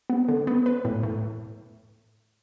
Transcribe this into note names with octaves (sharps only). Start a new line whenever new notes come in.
B3
D3
B3
B4
A2
A2